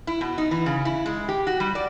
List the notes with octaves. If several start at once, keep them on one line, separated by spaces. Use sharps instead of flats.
E4
B2
D#4
E3
C#3
E4
G#3
G4
F#4
G3
D5